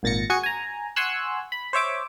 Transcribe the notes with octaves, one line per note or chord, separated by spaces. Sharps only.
G#1 A#2 A6 A#6 C#7
F#4 G#4 G#5 C#6 C#7
G#5 A#5
F#5 G#5 C6 C#6 E6 F#6
B5
C5 C#5 E5 D6